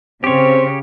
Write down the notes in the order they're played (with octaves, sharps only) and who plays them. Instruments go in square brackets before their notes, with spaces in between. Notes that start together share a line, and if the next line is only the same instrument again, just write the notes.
[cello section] C#3 [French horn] C4 [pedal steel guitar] G4 C#5 [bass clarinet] C5